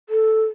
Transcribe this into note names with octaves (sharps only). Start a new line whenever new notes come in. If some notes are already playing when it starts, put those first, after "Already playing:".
A4